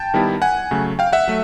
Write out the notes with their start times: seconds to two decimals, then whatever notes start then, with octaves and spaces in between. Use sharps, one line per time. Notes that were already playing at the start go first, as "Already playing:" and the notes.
Already playing: G5 A5
0.14 D#3 G3 B3 E4
0.42 F#5 G#5
0.71 C#3 F#3 A3
0.99 F5 G5
1.13 E5 F#5
1.28 F#3 A3